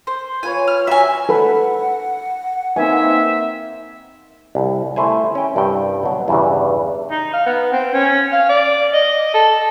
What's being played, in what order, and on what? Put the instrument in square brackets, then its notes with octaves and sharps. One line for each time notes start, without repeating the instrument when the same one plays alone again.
[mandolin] C5
[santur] F4 B4 C#5 [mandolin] G#5
[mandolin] F6
[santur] F#3 [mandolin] E5 G#5
[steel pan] A4 B4 B5 [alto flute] F#5
[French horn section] A#3 C4 D#4 [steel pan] B4 G#5 [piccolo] E5
[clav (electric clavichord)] C2
A3 E4 C5 G#5
C#4 G5
C2 G2 A4 G5
B2 F#3
E2 G2 C#3 E3
[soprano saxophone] D#4
F5
B3
C4
C#4
F5
D5
D#5
A4